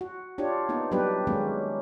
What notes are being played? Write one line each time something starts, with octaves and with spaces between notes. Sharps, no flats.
F#4
D4 F4 G4 C#5
A#3 B3 D#4
F#3 G3 B3 D4 G4 B4
D#3 F#3 G#3 A#3 C#4